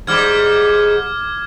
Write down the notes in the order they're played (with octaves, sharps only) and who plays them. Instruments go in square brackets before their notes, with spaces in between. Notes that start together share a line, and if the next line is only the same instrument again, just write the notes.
[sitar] G#2 G3 [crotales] D6 F6 G#6